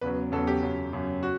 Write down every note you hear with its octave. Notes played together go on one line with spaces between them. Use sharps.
E2 C#3 F#3 B4
E2 C#3 F#3 A4
G4
F#2 C#3 F#3
F#2 C#3 F#3
F#4